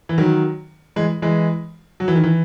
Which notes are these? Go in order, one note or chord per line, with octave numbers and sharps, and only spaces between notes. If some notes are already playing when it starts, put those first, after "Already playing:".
E3
D#3 F#3
E3 G#3
E3 G#3
F#3
E3
D#3
E3